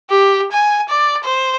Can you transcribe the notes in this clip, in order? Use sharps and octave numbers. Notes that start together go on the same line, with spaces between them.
G4
G#5
D5
C5